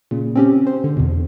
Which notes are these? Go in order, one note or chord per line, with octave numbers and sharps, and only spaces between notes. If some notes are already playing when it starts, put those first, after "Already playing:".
A#2 C#3
C4 C#4 G4
C5
D3
E2 B2